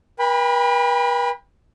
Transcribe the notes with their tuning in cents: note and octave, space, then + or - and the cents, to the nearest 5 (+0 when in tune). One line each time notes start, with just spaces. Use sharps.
B4 -45 G5 +40 B5 +0